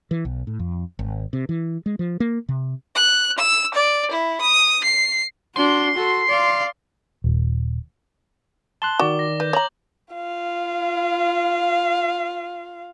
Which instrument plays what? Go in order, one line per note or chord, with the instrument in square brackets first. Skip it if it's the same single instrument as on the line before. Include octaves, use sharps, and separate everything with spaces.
[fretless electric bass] E3
B1
A2
F2
G#1
C3
E3
G#3
F3
A#3
C3
[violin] F#6
E6
D5
E4
D#6
C7
[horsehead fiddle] D4 F#4 [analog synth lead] C6
[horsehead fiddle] F#4 A4
D5 F5
[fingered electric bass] D#1
[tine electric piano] A5 C6 F#6 [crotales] G7
[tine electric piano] D#3 D5 [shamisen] F#4 [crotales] D6
[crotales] A#6
[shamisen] B4 [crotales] G6
[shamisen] C#5 A#5 [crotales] A#6 F#7
[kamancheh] F4 F5